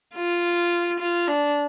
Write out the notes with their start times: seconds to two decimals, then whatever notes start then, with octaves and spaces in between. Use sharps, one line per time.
0.15 F4
0.99 F4
1.28 D4